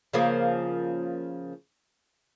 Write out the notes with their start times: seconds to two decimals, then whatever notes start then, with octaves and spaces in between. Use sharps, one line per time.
0.13 C#3 F3 A#3